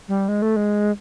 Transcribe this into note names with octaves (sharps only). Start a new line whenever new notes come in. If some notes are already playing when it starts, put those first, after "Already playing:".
G3
G#3
A3
G#3